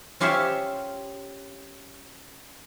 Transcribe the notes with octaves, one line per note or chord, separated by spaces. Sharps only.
C#4 F4 G4 C5 C#5 E5